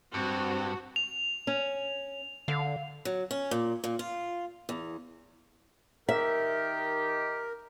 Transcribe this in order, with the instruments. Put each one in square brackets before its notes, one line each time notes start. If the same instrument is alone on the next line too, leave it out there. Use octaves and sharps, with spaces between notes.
[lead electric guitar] G2 [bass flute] C4 [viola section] F#4
[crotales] F7
[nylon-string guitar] C#4
[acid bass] D3 [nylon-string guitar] F5
[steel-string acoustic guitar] F#3
C#4
A#2
A#2
F4
E2
[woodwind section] D#3 G4 [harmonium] A#4 [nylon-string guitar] E5